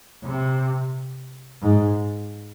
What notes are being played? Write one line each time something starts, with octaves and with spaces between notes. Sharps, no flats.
C3
G#2